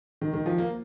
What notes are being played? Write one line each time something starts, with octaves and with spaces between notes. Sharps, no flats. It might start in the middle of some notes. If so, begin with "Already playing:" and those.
D#3
D#3
F3
A#3